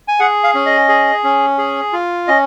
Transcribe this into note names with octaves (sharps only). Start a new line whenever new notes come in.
G#5
G#4 F#5
F5
C#4
D#5
G#4
C#4
G#4
F4
C#4 D#5